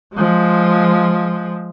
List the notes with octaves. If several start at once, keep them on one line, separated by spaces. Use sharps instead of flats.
F3 G#3